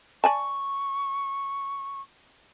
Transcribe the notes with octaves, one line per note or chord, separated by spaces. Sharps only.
D5 G#5 A5 C#6